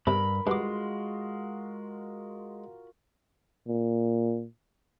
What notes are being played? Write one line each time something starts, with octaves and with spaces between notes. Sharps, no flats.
G2 C3 A#4 B5
G2 G#3 F4 F#4 F5 D6
A#2